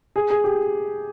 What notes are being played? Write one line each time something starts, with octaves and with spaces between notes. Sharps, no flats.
G#4
G#4
G4